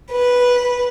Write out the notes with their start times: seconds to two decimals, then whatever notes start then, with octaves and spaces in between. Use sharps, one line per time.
0.11 B4